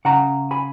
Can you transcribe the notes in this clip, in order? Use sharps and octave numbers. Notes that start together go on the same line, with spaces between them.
C#3 F#5 A#5
G#5 B5